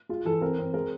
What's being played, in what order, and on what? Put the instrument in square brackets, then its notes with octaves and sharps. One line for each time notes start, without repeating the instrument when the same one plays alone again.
[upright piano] G#3 [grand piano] F4
[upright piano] E3 [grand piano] A4
[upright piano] C4 [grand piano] A#4
[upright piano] C4
[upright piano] G#3 [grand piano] A#4